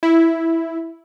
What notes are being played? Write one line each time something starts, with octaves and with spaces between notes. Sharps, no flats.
E4